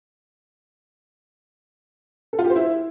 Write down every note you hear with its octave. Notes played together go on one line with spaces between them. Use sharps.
A4
F4
G4
C5
E4